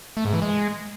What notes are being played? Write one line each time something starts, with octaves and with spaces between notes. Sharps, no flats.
A3
G#2
E3
G#3